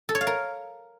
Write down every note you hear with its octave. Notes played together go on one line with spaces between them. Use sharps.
A4
C#5
F5
A#4